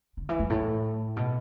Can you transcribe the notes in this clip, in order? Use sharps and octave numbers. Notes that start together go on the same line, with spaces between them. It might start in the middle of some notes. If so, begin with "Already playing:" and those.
D3
E3
F#2
A2
B2